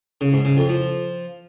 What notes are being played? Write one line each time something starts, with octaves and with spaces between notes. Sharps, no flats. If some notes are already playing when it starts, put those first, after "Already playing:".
C#3
G#2
C#3
F2
F3